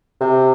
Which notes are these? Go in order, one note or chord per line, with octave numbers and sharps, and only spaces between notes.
C3